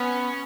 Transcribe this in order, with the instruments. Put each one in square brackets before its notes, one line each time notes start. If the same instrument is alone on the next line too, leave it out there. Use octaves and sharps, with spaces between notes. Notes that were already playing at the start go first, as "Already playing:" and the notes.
Already playing: [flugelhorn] B3 [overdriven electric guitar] C#4